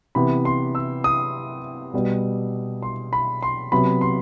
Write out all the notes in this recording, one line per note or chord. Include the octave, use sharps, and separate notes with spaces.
C3 E3 B3 B5
C6
E6
D#6
B2 G3 B3
C6
B5
C6
C3 F#3 B3 B5
C6